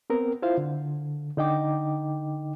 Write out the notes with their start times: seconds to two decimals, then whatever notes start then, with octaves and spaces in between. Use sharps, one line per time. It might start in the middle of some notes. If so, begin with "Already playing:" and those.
0.10 B3 C4 A#4
0.42 E4 F4 C5 F5
0.57 D3
1.37 D3 D#4 D#5 G5 D6